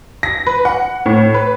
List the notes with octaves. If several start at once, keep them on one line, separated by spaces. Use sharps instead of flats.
A#6
B4
F#5
A2
B4